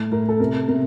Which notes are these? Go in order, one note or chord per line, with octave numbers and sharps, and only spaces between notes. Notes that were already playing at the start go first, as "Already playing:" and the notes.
Already playing: A2
A2 A#4
A4
C3 A#4
C3 A#4